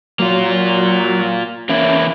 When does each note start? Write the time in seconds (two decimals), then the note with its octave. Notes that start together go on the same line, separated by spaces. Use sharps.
0.19 F#3 A#3 F4
1.69 E3 A#3 C#4 E4